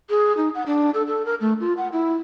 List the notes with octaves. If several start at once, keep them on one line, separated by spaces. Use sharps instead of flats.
G#4
D#4
F#5
D4
A4
A4
A#4
A3
F4
F#5
E4